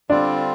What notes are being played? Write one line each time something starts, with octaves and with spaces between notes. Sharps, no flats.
D3 G3 C4 D4 F4